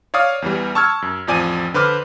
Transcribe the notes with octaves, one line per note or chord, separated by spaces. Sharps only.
C#5 D5 F5 D#6 F6
E2 E3 G3
A5 C#6 E6 F6 G#6
F#2
A1 F2 F3 D5 G#5 D#7
D3 B4 C5 D6 F6